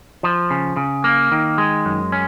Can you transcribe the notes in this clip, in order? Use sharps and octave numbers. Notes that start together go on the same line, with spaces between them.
F3
C#3
C#3
A#3
D#3
G#3
F#2
C#4